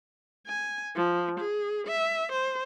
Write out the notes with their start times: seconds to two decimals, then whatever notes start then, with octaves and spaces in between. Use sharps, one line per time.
0.47 G#5
0.96 F3
1.40 G#4
1.88 E5
2.32 C5